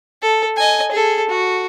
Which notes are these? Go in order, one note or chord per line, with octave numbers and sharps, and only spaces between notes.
A4
D#5 G#5
G#4 A4
F#4